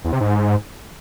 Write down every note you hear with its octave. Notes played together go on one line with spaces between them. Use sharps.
E2
C3
G#2